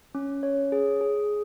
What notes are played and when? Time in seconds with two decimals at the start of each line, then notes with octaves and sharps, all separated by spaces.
0.15 C#4
0.43 C#5
0.72 G#4
1.01 G#4